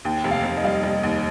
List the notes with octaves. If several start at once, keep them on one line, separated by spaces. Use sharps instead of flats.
D#2 G5
F1
F5
F1
D#5
G3 F5
D#5
G3 D#5
D#2